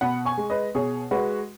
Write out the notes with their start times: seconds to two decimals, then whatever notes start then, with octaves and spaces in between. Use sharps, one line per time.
0.01 B2 F#5 B5
0.25 G#5 C#6
0.38 G#3
0.50 B4 D#5
0.75 B2 G#4 C#5
1.11 G#3 F#4 B4